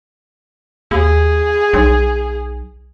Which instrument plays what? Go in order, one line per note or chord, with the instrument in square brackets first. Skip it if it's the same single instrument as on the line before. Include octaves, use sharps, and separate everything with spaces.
[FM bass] D#2 [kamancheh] G#4
[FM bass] B1